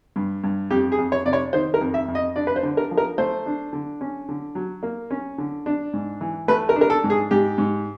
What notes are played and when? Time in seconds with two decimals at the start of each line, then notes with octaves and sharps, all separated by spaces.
0.16 G2
0.43 G2
0.70 F2 G4
0.92 G#4
0.98 F2
1.12 C#5
1.26 C3 D5
1.33 C#5
1.53 D#3 C5
1.74 A#4
1.81 F2
1.94 E5
2.08 F2
2.15 D#5
2.36 D4 D5
2.47 B4
2.56 C5
2.63 D3
2.77 A#4
2.91 F3
2.97 A#4
3.18 A3 C5
3.46 D4
3.73 D3
4.01 C#4
4.29 D3
4.55 F#3
4.83 A#3
5.11 C#4
5.38 D3
5.66 D4
5.93 G#2
6.21 E3
6.48 A3 B4
6.69 A#4
6.76 D4
6.81 A#4
6.90 A4
7.04 G#2
7.10 G#4
7.31 G#2 G4
7.58 G#2